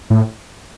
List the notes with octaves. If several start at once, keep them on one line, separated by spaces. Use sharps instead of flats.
A2